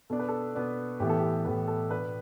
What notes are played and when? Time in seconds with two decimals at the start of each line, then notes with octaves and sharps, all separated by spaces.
0.10 B2 B3 D4 A4
0.19 B4
0.28 A4
0.55 B2 B3 D4
1.00 A2 E3 B3 G4
1.09 A4
1.19 G4
1.45 A2 E3 B3 B4
1.68 A4
1.90 B2 B3 D4 B4